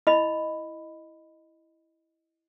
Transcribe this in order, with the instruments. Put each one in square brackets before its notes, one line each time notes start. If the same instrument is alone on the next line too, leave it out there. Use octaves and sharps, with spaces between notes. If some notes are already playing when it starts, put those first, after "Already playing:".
[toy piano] E4 D#5 B5